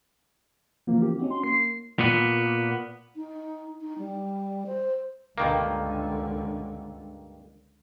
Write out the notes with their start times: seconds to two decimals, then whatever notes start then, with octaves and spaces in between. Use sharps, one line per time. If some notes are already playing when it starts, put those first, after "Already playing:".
0.87 C#3 E3 F3 A#3
1.02 G4
1.19 C4 C#4 D#4 F#4
1.31 C6
1.44 A#3 C7
1.99 A#2 B3
3.16 D#4
3.81 D#4
3.98 G3
4.66 C5
5.38 C#2 G2 D3 D#3 A#3